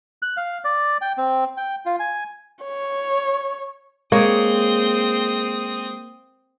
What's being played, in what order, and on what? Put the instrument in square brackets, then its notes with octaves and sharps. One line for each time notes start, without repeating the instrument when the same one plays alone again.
[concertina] F#6
F5
D5
G5
C4
G5
F4
G#5
[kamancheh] C#5
[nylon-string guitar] G#3 [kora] A#3 C#5 [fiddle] C4 D#6